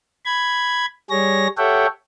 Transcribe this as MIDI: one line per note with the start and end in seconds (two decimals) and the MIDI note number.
0.26 0.86 83
0.26 0.86 92
1.10 1.47 55
1.10 1.47 68
1.10 1.47 73
1.10 1.47 94
1.58 1.87 67
1.58 1.87 69
1.58 1.87 73
1.58 1.87 76
1.58 1.87 78
1.58 1.87 79